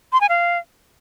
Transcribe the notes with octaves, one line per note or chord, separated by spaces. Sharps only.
C6
G#5
F5